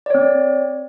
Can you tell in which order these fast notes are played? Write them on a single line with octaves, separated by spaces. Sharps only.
D5 C#5 C4